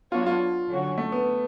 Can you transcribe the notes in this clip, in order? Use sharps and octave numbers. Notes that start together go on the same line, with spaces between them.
F#3 B3 D4 F4 F#4 C#5
F4
D3 F#3 C#4 F#4
A3
B3